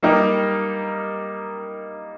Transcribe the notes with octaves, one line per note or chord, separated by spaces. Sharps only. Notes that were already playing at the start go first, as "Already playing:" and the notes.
G3 A#3 D#4 G4 A#4